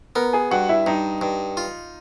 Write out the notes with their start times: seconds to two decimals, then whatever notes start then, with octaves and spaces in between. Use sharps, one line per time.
0.16 B3 A#4 A#5
0.33 G#4 G#5
0.51 G2 F#4 F#5
0.69 E4 E5
0.86 G2 D#4 D#5
1.21 G2
1.57 F4